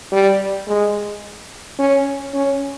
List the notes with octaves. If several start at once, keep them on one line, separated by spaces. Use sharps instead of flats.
G3
G#3
C#4
C#4